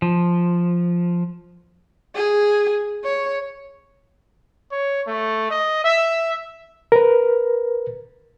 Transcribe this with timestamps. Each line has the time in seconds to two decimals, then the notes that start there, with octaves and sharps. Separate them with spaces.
0.02 F3
2.15 G#4
3.04 C#5
4.71 C#5
5.07 A3
5.50 D#5
5.84 E5
6.92 A#4 B4